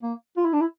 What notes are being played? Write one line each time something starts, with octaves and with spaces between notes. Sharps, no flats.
A#3
F4
E4
D4
E4